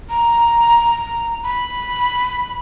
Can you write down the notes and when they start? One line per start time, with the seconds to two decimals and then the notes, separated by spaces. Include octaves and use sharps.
0.10 A#5
1.43 B5